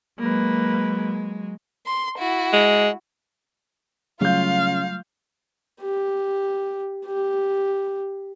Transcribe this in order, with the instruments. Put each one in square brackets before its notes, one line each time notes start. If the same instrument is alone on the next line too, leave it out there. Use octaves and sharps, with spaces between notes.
[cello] F#3 G#3 [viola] A#3 B4
[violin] C6
E4 F#4
[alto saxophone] G#3
[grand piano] C#3 G6 [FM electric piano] F#3 G3 A3 [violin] F4 [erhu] F5
[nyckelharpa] G4
G4